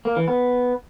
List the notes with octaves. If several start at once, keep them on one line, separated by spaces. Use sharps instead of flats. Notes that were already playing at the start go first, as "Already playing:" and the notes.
A#3
E3
B3